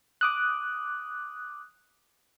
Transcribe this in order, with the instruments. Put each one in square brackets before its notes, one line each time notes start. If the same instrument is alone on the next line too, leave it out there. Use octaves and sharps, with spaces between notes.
[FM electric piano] D6 D#6 F#6